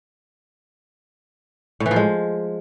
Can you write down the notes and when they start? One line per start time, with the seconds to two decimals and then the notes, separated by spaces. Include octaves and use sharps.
1.80 A2
1.86 E3
1.91 F3
1.96 G#3